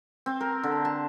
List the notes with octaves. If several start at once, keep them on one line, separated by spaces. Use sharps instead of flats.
C4
A#4
D3
A5